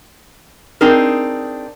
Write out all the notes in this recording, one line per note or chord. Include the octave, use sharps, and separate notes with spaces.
C4 D4 D#4 G#4 A#4